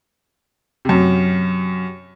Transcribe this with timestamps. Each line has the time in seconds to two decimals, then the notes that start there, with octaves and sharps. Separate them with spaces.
0.85 F#2 C3